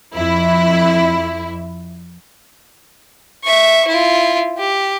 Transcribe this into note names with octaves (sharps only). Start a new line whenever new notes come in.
F2 E4
E5 C#6
E4 F4
G4